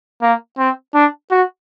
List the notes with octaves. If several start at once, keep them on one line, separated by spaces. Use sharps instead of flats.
A#3
C4
D4
F#4